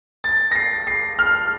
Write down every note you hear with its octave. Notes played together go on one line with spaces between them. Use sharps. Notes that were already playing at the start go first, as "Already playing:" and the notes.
A6
A#6
C7
C7
F6